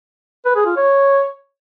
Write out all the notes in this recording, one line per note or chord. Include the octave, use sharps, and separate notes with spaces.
B4
G#4
F4
C#5